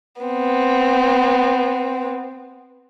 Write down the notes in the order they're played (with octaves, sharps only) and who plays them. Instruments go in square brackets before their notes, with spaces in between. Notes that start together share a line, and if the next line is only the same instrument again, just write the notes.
[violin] B3 C4